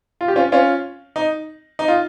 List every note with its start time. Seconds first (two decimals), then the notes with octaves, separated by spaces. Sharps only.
0.21 F4
0.28 G4
0.36 C#4 F4
0.52 C#4 F4
1.16 D#4
1.79 D#4
1.88 F4